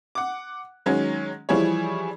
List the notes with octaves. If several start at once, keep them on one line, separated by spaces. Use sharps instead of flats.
F#5 D6
D#3 F#3 G#3 C#4
E3 F3 G3 E4 G#4 C#5